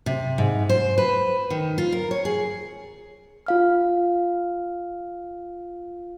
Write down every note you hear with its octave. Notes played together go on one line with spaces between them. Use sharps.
C3
G#2
C5
B4
D#3
F4
A#4
C#5
G#4
F4 F5 F6